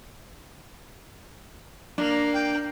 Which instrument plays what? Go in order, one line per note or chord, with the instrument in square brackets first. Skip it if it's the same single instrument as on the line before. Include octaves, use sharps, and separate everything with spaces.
[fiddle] A#3 [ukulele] D4
[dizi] G5